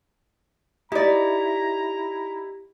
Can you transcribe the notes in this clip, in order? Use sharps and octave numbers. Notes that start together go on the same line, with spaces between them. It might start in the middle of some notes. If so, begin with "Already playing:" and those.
D#4 E4 G4 D5 A#5